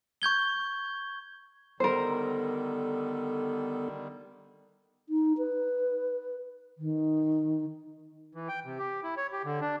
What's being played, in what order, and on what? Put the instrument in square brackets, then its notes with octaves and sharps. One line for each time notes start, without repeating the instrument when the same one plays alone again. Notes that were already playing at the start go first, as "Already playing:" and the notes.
[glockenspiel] C#6 G6 G#6 G7
[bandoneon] D3 D#3 G3 [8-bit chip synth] B3 A4 [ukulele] A#4 C5
[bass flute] D#4
B4
D#3
[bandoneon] E3
G5
C3
G4
E4
C#5
G4
D3
D4